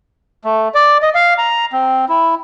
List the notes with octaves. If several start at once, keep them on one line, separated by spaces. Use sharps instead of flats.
A3
D5
D#5
F5
A#5
C4
E4